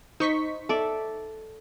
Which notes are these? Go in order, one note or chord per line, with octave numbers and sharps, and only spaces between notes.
D#4 C5 C#6 B6
A4 D5 E5